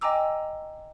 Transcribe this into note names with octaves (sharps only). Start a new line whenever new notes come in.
D#5 G5 G#5 A#5 D6 E6